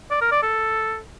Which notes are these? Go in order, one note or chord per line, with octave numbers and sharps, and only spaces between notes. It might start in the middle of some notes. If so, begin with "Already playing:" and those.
D5
A#4
D5
A4